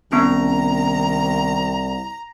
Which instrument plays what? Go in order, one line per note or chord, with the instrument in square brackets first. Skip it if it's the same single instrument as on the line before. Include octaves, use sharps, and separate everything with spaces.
[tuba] C2 [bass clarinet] D#3 [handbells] B3 C#4 E4 [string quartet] A#5